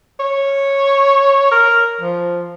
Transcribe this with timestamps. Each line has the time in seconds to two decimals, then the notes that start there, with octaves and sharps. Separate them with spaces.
0.19 C#5
1.51 A#4
2.01 F3